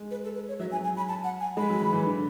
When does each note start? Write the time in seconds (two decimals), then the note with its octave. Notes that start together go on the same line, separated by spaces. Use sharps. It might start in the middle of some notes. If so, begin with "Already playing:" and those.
Already playing: G#3
0.11 B4
0.24 A4
0.35 B4
0.48 C#5
0.59 F#3 E5
0.72 G#5
0.84 G#5
0.97 B5
1.08 A5
1.24 F#5
1.40 G#5
1.57 G#3 B5
1.69 F#3
1.81 E3
1.93 E3
2.05 D3